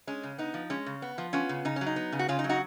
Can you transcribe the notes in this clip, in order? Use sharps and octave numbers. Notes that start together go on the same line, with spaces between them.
G#3 C#4
C#3
B3 D#4
F3
G#3 C#4
C#3
B3
F3
B3 C#4 F4
C#3
C#3 D#4
C#4
F#3
D#4
B3
C#3
F#4
C#3 C#4 F4
D#4
F#3
D#4 F#4